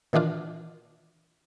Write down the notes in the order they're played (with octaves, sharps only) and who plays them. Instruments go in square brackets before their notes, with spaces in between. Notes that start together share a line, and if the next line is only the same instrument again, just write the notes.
[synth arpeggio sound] A#2 D#3 E3 D4 F4